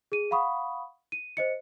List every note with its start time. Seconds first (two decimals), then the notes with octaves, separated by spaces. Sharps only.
0.12 G#4 D#7
0.31 F5 F#5 B5 C#6 D#6
1.12 D#7
1.37 C5 D#5 C#7